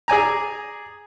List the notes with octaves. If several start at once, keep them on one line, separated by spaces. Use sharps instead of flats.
G#4 D5 G#5 A#5